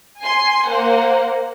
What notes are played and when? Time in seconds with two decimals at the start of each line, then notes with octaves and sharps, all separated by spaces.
0.21 G#5 C6 C7
0.68 A#3 C5 F#5